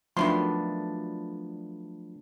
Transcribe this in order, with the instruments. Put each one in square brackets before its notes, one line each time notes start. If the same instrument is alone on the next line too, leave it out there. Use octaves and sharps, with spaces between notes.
[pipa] D#3 E4 C6 [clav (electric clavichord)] F3 B3 [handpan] F#3 A3 D4